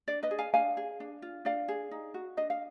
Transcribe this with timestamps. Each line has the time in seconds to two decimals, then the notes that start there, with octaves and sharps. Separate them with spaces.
0.08 D4 D5
0.23 B4 D#5
0.31 G#4
0.39 F5 G#5
0.54 D4 F5 G#5
0.77 G#4
1.00 D4
1.22 F4
1.45 D4 D5 F5
1.68 G#4
1.91 D#4
2.14 F#4
2.37 D4 D#5
2.50 F5